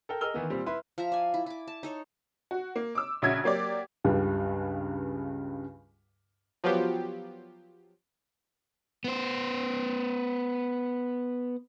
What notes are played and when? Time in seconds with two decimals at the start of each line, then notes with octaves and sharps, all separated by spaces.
0.09 A4 A#4 G5
0.21 G#4 A#4 D#5 E6 F6 G7
0.34 D#3 E3 B3
0.50 A#2 G3 C4
0.66 E4 B4 B5 C6
0.98 F3 F4 E5 A#5
1.12 D5 G#5
1.34 E4
1.46 E4 D6
1.67 A5
1.83 D#4 A4 C#5
2.51 F#4
2.76 A#3
2.95 D6 E6
3.22 A#1 C#3 F#4 E5 G#6
3.44 F#3 A#3 G4 D5
4.04 C#2 G2 C#3 G3
6.64 F3 F#3 B3 F4 G4
9.04 B3 C5